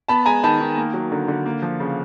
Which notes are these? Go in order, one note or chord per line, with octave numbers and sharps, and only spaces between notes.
B3 A5 B5
G#3 G#5 A#5
D#3 A5 B5
D#3
A#3
F#3
D3
D3
A#3
F3
C#3